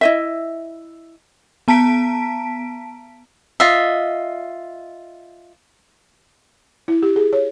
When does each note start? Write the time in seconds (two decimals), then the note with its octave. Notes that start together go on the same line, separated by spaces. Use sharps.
0.01 E4 D#5 E5
1.68 B3 A5 A#5 B6 D7
3.60 F4 D#5 E5
6.88 E4
7.02 G4
7.16 G#4
7.33 C#5